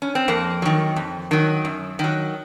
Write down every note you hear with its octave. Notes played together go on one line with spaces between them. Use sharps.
C#4
C4
F2 A#3
D#3 F#3
F2
D#3 F#3
F#2
D#3 F#3